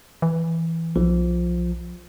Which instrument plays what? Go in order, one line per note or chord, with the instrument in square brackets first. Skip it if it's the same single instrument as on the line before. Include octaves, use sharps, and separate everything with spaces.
[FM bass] E3
[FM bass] B1 [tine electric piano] F3